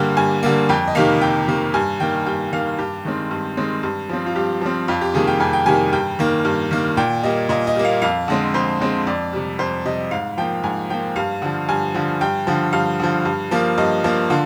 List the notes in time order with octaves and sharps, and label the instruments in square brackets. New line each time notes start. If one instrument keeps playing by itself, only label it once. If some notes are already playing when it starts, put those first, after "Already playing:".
Already playing: [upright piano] G2 D3 G3 A#3 G5
G2 G#5
D3 G3 A#3
F2 G5
D#5
C3 D#3 A#3 F5
F2 G5
C3 D#3 A#3
G2 G#5
D#3 A#3 G5
G2 G5
D#3 A#3 F5
G2 G4
D#3 G#3 C4
G2
D#3 G#3 C4
G2
F3 C4
F4
G2 G4
F3 C4
F2 F4
G4
C3 D#3 G3 A#3 G#4
G5
F2 G#5
G5
C3 D#3 G3 A#3 G#5
G2 G5
D#3 A#3
G2
D#3 A#3
A#2 G5
G3 A#3 D#5
A#2 D#5
D#5
G3 A#3
F5
F2 F5
D3 G#3 C4
F2 C5
D3 G#3 C4
F2 D5
C3 G3
F2 C5
C3 G3 D#5
G#2 F5
F3 A#3 G5
G#2 G#5
F3 A#3 G5
G2 F5
D3 F3
G2 G#5
D3 F3
G2 G5
D3 F3
G2 F5
D3 F3
G2
F3 A#3
G2 D#5
F3 A#3
D3 F4